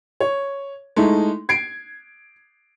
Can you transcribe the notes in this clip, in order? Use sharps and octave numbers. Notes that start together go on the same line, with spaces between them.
C#5
G#3 A3 D#4 E4
G#6 C7 D7